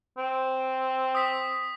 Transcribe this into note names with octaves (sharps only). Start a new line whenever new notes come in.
C4
D#6 B6